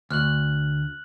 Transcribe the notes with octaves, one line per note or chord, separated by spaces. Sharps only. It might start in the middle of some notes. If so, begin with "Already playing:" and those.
D2 F6 F#6 F#7